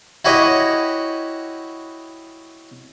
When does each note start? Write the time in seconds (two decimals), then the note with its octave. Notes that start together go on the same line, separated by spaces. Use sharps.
0.25 E4 F#4 G4 C#5 D#5